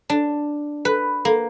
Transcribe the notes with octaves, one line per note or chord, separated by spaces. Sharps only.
D4
B4
A#3